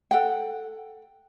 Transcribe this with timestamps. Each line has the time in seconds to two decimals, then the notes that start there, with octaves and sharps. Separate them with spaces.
0.11 A4 F#5 G5